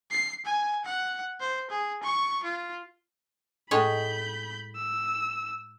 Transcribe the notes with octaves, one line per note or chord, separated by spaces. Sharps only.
C7
G#5
F#5
C5
G#4
C#6
F4
A2 G#3 C#5 B5 G6
E6